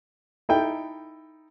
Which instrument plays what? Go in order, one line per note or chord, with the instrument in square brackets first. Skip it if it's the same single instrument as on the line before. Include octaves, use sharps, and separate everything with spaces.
[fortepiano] D#4 E4 A4 G5